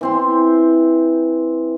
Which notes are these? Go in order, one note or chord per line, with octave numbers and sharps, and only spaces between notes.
E3 C4 C6